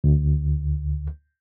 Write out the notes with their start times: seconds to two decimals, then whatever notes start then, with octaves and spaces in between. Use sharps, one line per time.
0.04 D2